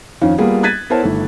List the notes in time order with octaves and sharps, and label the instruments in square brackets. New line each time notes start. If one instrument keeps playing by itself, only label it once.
[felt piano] F2 D#3 C#4 D#4 F5
G3 A#3 B3 F4 G#4
F#6 G#6 A6 B6 D#7
B3 E4 A#4 C5 C#5 A5
G1 D#3 A3